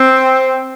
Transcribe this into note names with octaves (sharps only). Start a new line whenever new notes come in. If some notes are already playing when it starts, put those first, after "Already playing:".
Already playing: C4